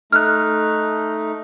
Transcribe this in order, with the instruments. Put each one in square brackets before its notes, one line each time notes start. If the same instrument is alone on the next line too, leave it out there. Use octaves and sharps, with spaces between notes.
[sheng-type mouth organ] A3 D#4 [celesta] F6 F#6